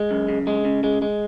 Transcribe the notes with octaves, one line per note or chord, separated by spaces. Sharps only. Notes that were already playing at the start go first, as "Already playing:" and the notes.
Already playing: G#3
F#2
C#3
G#3
C#3
G#3
G#3